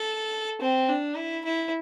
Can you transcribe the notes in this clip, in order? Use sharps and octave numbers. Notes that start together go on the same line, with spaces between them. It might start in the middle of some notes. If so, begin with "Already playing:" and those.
Already playing: A4
C4
D4
E4
E4